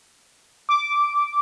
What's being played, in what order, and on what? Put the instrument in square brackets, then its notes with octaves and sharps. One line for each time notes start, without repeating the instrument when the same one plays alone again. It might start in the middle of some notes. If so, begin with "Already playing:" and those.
[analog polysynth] D6